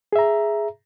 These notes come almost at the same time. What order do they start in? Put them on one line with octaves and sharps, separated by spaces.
G#4 E5 A#5